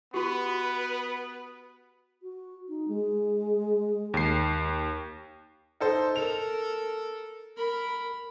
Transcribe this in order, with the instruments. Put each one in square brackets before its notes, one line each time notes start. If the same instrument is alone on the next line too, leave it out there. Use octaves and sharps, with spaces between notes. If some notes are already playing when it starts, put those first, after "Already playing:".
[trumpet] B3 [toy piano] F#4 G4 [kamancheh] B4
[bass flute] F#4
D#4
G#3
[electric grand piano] D#2 C7
[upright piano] D#4 A4 C5
[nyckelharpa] A4 A#4 [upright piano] F7
[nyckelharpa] A#4 B5